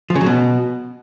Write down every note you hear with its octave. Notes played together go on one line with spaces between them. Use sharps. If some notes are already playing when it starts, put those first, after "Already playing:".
F3
C#3
F#3
B2